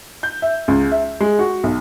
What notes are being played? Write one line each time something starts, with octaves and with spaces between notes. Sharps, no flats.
G6
E5
C#2
E5
G#3
F#4
B1